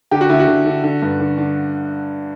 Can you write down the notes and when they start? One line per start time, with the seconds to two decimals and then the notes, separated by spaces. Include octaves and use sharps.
0.11 D3 G4
0.21 F#4
0.29 D3 E4
0.39 F#4
0.47 D3
0.66 D3
0.84 D3
1.02 G2
1.20 D3
1.38 D3